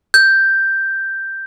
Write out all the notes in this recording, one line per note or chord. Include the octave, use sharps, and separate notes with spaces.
G6